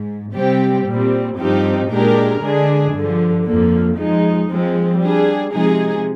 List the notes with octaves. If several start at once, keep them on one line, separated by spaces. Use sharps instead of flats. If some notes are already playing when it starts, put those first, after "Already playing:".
Already playing: G#2
C3 G3 C4 G4
A#2 G3 C4
G2 F3 C4 D#4 G4
A#2 G#3 D4 G4 A#4
D3 G#3 D4 G#4
G2 D3 F3
F2 D3 F3 A#3
F3 G#3 D#4
F3 G#3 C4
G3 D4 G#4
C3 F3 G#3 D#4 G#4